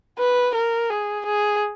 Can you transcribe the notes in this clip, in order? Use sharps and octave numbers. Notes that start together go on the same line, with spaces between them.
B4
A#4
G#4
G#4